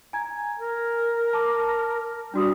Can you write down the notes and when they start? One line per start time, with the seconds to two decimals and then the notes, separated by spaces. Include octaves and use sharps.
0.13 G#5 A#5 G#6
0.58 A#4
1.33 A5 D6
2.34 G3 D4 F#4 D#6